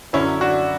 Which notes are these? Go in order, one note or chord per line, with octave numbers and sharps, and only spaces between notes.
F#2 D3 F#3 C#4 E4
D4 F#4